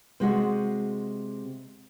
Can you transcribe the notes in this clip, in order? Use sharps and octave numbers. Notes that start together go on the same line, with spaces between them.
C3 G#3 F#4